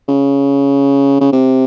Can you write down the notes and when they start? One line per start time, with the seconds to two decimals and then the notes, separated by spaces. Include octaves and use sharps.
0.08 C#3
1.21 C#3
1.33 C3